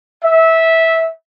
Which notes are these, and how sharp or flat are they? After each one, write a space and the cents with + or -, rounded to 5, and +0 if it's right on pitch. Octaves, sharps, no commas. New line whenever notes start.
E5 -15